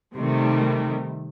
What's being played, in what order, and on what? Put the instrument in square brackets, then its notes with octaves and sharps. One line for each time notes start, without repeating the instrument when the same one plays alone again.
[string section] C3 D#3 G3 A3